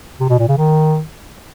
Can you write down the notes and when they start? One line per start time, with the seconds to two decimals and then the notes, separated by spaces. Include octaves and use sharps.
0.20 C3
0.30 B2
0.39 A#2
0.48 C#3
0.58 D#3